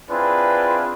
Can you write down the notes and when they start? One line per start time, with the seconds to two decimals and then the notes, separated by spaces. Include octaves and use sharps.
0.10 C4 D4 E4 F4 G#4 B4